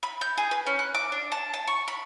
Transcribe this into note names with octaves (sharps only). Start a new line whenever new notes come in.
B5
G6
G#4
B4
C#4
F#6
D6
D4
A5
A5
C#6
B5